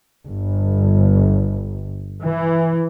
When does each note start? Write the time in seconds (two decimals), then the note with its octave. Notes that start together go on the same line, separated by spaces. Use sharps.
0.25 G1
2.24 E3